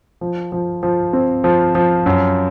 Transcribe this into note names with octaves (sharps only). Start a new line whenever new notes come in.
F3
F3
F3
C4
F3
F3
F#2